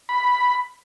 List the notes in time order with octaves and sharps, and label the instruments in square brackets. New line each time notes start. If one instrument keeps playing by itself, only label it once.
[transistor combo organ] B5